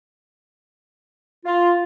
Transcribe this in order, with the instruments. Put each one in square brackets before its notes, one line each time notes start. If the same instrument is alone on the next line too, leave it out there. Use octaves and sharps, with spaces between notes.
[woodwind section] F4